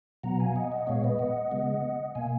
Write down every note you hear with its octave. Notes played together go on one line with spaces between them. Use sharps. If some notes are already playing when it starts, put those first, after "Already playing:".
B2 F#3 B3 F#5 A#5
F5 G#5
D#5 F#5
D#5 F#5
A#2 G#3 B3 C#5 F5
B4 D#5
D#5 F#5
C#3 G#3 B3
B2 A#3 F5 G#5